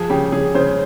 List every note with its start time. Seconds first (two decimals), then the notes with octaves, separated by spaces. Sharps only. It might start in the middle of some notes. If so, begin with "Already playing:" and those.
Already playing: F3 G#4
0.10 C#3 G4
0.32 C#3 G#4
0.55 C#3 C5